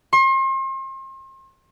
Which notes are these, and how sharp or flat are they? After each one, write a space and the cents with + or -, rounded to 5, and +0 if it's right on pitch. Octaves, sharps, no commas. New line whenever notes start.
C6 +40